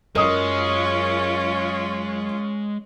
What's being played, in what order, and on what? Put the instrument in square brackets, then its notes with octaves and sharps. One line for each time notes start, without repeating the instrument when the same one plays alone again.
[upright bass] F#2 [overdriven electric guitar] G#3 [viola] C#4 F4 [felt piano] A#4 D#5 D#6